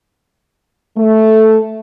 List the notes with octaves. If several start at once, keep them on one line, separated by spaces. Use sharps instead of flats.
A3